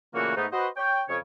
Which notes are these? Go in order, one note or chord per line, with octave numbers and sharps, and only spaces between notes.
A#2 C#3 E3 A3 A#3 F#4
G#2 A3 B3 D#4
F#4 B4 C5 D#5
C#5 G5
F2 C#3 C#5